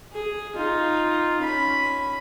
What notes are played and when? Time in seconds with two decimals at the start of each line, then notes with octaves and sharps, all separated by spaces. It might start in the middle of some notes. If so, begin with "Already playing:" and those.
0.12 G#4
0.56 D#4 F4
1.41 C#4 B5